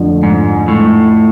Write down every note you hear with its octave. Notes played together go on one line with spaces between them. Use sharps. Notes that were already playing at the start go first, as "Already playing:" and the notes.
Already playing: F2 D3 F3 A3
G#2
A2